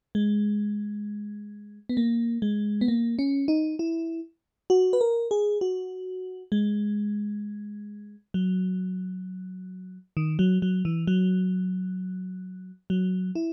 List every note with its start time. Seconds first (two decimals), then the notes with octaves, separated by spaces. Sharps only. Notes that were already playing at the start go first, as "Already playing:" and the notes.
0.15 G#3
1.89 B3
1.97 A#3
2.42 G#3
2.81 B3
2.88 A#3
3.19 C#4
3.48 D#4
3.79 E4
4.70 F#4
4.93 B4
5.01 A#4
5.31 G#4
5.61 F#4
6.52 G#3
8.34 F#3
10.17 D#3
10.39 F#3
10.62 F#3
10.85 E3
11.07 F#3
12.90 F#3
13.35 E4